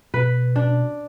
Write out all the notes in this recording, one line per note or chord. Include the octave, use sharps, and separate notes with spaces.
B2 B4
D4